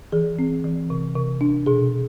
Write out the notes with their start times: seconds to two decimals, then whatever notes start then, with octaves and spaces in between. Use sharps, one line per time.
0.12 E3 G#4
0.39 C4
0.64 E3
0.90 C3
1.15 C3
1.41 D4
1.66 B2 G#4